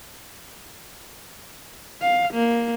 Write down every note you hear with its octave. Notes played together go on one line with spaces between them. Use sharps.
F5
A#3